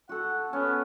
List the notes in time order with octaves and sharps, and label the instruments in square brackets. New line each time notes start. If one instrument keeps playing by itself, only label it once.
[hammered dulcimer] F#4 A4 [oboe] F#5
[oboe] B3 [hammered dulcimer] C#4